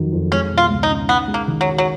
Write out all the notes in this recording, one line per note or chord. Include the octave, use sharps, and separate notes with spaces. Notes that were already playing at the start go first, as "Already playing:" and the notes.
Already playing: F2 D#3 F#3
F2
G#3 C#4
B2
F4
C#2
D#4
C#4
B3 D#4
G#3
A#3
D#3
F#3
F#4
F#3